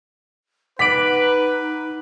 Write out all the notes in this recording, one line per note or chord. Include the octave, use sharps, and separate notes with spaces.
D#4 B4 F#5 D6 B6 D7 F#7